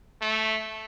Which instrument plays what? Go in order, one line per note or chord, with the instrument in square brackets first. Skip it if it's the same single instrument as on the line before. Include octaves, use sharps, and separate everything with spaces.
[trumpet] A3